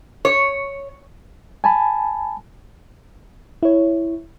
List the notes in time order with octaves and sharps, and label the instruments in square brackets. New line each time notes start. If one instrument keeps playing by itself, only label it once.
[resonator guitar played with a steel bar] C#5
[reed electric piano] G#5 A5 B5
[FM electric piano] E4 C#5